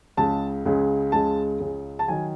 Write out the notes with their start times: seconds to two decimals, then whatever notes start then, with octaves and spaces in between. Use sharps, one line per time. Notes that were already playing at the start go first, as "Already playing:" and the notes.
0.17 C#2 C#3 G#3 A5
0.66 C#2 C#3 G#3
1.12 C#2 C#3 G#3 A5
1.60 C#2 C#3 G#3
1.99 A5
2.08 D#3 F#3 G#5